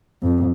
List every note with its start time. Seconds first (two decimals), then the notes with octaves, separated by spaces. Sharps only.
0.23 F2